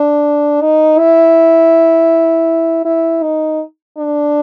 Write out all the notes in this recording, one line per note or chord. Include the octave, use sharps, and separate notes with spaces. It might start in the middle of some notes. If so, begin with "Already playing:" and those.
Already playing: D4
D#4
E4
E4
D#4
D4